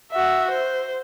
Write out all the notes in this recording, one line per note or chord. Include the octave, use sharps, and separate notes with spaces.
F#4 E5
C5